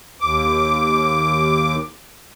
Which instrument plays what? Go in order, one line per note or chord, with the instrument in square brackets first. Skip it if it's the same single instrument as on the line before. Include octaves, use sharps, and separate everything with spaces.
[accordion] D#2 D6